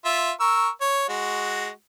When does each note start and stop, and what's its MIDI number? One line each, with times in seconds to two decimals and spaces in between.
0.05 0.31 65
0.05 0.31 76
0.40 0.69 70
0.40 0.69 85
0.40 0.69 88
0.81 1.07 73
1.08 1.69 56
1.08 1.69 66